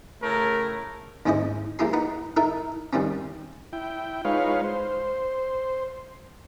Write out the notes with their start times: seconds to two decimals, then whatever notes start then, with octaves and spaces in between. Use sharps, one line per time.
0.23 A2 C#3 A3 A#4
1.26 D#2 G#2 C#4 E4 C5 D#5
1.79 F3 A#3 E4 G4 G#4 C6
1.93 D#4 B4 F#5 B5
2.37 D#4 E4 A4 A#4 E5
2.93 B2 D#3 G3 C4 C#4
3.73 E4 G5
4.25 G#3 D#4 F4 B4 C#5 F5
4.64 C5